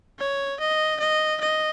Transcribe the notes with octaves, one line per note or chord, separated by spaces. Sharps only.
C#5
D#5
D#5
D#5